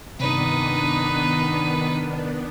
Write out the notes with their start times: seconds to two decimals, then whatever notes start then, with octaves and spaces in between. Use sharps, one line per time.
0.20 G2 C3 D#3 B3 D4 D#4 B4